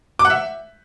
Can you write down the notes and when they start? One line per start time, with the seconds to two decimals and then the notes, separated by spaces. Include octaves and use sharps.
0.19 D6
0.25 F#5
0.30 E5